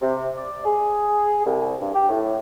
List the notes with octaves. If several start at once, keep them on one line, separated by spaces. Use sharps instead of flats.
C3
D5
G#4
C2
G2
G4
A2